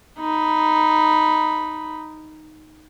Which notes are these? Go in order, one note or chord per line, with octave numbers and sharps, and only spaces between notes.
D#4 B5